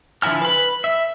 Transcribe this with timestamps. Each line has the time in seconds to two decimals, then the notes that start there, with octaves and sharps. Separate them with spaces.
0.22 D3 F3 E4 G#5 F6
0.42 B4 B5
0.84 E5